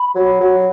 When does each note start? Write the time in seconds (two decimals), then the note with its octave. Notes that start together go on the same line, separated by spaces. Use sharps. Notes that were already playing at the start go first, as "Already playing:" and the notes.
Already playing: B5
0.15 F#3
0.40 F#3